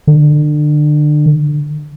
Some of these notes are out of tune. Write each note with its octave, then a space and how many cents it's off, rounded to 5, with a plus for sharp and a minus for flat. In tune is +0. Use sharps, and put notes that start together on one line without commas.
D3 +30